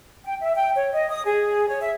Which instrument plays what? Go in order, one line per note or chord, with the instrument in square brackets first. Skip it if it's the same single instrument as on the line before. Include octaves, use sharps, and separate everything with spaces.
[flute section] G5
E5
G5
C#5
D#5
D#6
G#4
C#5
E5